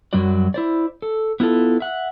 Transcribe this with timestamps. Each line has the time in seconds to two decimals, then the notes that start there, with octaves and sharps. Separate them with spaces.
0.13 F#2 F#3 G3 F#4 D5
0.54 E4 C5 D5
1.02 A4
1.40 B3 E4 F4 A4
1.80 E5 F#5